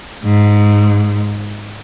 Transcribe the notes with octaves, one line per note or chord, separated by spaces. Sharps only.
G#2